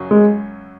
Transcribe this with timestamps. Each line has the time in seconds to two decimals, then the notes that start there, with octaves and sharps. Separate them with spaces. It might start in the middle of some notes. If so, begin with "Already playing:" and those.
Already playing: F#2 C#3 F#3 C#4
0.11 G#3